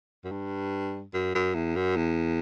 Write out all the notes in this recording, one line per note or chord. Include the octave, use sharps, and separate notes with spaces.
F#2
G2
F#2
F#2
E2
F#2
E2